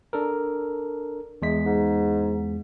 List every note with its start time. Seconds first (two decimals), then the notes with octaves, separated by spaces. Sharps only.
0.13 D4 A4 A#4
1.42 E2 G#3 B6
1.66 G#2